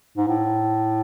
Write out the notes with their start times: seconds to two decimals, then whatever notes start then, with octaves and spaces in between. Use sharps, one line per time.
0.17 G#2
0.28 A2